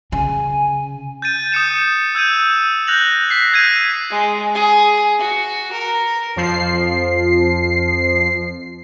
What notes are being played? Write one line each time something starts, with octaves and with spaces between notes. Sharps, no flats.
C#3 G#5
G6 A6 D#7
D#6 G6 C#7 E7
E6 G6 G#6 D#7
F#6 G6 A#6 F7 F#7
B6 C7
E6 G6 G#6 B6 C7 D#7
G#3
G#4
F#4
A#4
F2 F3 C7